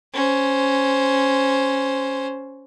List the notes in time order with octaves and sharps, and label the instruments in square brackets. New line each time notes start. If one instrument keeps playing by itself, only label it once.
[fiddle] C#4 C5